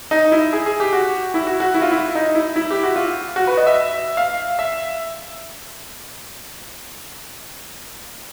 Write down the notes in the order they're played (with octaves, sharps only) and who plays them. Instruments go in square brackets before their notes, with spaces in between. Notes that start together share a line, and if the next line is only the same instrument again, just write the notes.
[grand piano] D#4
E4
G#4
G#4
G4
F#4
E4
F#4
F#4
E4
F4
E4
D#4
E4
E4
G4
F#4
F4
F#4
B4
D#5
E5
F5
E5